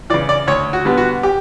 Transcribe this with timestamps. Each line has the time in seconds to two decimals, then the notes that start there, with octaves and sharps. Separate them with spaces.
0.10 E3 D5
0.14 C#3
0.29 D5
0.47 D2 C#5
0.73 F#4
0.85 D3 G3 B3
0.97 F#4
1.23 G4